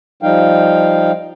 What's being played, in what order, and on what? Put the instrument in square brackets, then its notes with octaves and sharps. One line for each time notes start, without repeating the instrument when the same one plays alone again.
[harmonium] F3 G3 D#4 F5 G5